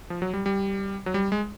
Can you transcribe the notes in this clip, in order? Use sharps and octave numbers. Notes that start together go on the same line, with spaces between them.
F3
F#3
G3
G3
F#3
G3
G#3